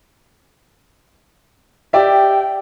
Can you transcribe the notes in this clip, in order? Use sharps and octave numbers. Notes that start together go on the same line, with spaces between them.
G4 D5 E5 G5